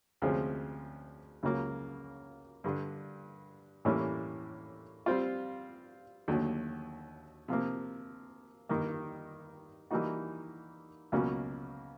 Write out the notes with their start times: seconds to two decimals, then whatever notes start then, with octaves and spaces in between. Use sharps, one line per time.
0.22 D2 C3 F3 G#3 C#4
1.43 C#2 C#3 F#3 A#3
2.64 G2 D3 G3
3.85 A2 E3 G3 A#3 C#4
5.06 G3 C4 F4
6.28 D#2 D3 F#3 A3
7.48 C3 F3 A#3
8.69 G2 D#3 G3 A#3
9.91 E3 G3 A#3 D#4 F#4
11.12 C#2 B2 F#3 A#3 C#4